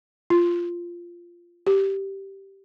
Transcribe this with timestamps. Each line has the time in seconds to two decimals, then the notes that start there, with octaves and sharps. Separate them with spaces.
0.30 F4
1.67 G4